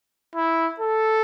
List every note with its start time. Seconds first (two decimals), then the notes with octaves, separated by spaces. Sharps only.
0.35 E4
0.80 A4